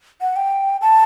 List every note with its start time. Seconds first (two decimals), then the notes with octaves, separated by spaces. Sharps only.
0.21 F#5
0.36 G5
0.82 A5